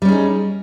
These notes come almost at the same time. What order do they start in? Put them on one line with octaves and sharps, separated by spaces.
G3 C#4 G#4 D#4